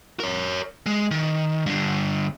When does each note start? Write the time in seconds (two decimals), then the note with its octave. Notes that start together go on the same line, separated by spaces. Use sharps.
0.20 A#4 C#5
0.86 G#3
1.11 D#3
1.66 G2 D3